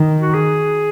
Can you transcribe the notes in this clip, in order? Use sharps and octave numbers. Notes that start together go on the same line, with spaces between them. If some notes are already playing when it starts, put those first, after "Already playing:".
Already playing: D#3
F#4
G#4